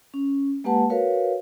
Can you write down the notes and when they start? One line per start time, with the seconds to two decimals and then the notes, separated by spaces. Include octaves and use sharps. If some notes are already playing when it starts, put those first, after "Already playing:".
0.14 C#4
0.64 G#3 A#3 G4 B4 F#5 A5
0.90 F#4 A#4 B4 C#5 F5